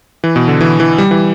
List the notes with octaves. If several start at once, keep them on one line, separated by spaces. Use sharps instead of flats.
E3
B2
D3
E3
E3
G3
E3